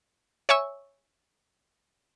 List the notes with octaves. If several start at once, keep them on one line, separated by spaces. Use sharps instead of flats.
C#5 E5 G#5 C#6 E6